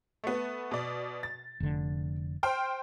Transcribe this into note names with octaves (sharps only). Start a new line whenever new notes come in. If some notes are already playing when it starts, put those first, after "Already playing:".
A3 B3
B2 D5
A6
F1 D3
C5 G5 F6